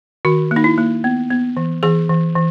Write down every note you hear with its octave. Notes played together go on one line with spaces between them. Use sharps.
D#3 F#4
A#3
D#4
E4
A#3
B3
B3
E3
E3 G#4
E3
E3